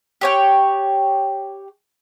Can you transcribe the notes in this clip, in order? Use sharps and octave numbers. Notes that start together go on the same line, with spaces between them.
G4 C#5 G5